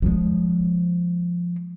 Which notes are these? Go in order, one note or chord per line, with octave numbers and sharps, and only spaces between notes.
F3 G#3